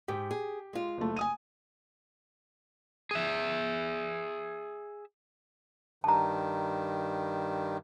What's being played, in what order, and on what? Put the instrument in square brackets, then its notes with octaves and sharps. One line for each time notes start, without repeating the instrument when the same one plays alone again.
[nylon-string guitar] G#2 [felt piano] G4
[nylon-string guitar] G#4
G#3 F4
[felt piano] F#1 A3
G#5 D#6 D#7
[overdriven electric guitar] G#4 E5
[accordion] G2 D#3 [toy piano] A5 A#5